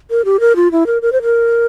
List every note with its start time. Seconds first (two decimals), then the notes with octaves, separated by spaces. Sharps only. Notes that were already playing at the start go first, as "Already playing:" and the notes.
0.11 A#4
0.25 G4
0.40 A#4
0.56 F4
0.72 E4
0.87 A#4
1.02 A#4
1.12 C5
1.23 A#4